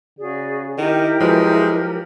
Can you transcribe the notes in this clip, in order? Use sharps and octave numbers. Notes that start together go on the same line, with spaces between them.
C#3 F#4 G#4 D5
D#3 E4 G4 A#4
F3 F#3 G#3 B4